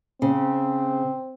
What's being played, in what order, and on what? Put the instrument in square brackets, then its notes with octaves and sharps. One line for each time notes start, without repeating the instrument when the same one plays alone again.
[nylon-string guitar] C#3 [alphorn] C4